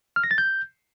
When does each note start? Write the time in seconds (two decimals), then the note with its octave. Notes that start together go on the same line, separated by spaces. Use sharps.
0.16 F6
0.24 A#6
0.31 A6
0.38 G6